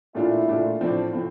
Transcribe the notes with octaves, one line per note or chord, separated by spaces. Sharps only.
A#2 A3 D4 E4 F4
A#2 A3 D4 F4
A2 F3 C4 D4
A2 F3 C4